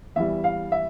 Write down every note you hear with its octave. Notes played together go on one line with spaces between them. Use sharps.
E2 E3 G3 E5
F5
E5